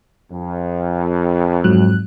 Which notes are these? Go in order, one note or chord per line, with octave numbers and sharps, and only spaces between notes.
F2
G#2 F#3 F#6